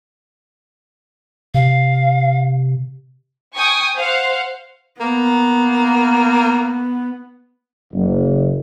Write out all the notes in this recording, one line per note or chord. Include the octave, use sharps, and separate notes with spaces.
C3 F5
G5 G#5 C#6 D#6
C5 F5 F#5
A#3 B3
F#1